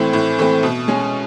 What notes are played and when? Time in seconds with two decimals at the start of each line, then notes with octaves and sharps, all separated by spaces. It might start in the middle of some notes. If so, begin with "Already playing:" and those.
Already playing: A2 E3 A3 C4
0.13 A2
0.39 E3 A3 C4
0.63 B2
0.88 G#3 C#4